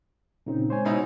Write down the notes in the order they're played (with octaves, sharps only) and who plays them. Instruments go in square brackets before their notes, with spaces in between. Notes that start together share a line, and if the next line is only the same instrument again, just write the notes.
[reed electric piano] A#2 C#3 C4 [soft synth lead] D#4
[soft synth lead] G#3 [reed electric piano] C5 C#5 G#5
[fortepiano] B2 D#4 E4